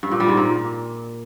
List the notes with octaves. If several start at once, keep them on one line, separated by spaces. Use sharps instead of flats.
G2
A#2
G3
G#2
A#2